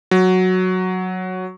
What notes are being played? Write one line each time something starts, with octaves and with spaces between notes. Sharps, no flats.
F#3